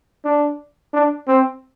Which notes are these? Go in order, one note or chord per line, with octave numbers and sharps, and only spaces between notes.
D4
D4
C4